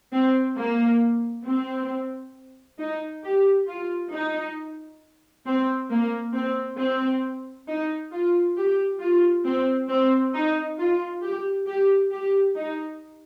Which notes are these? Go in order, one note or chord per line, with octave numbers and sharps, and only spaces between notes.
C4
A#3
C4
D#4
G4
F4
D#4
C4
A#3
C4
C4
D#4
F4
G4
F4
C4
C4
D#4
F4
G4
G4
G4
D#4